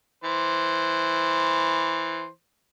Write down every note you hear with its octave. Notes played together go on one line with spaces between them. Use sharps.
E3 C5